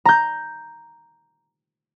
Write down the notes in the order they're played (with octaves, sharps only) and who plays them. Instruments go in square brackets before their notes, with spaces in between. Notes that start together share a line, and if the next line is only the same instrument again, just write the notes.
[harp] A#5 G6